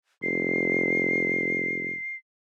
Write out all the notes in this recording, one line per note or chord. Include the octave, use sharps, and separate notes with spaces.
F1 C7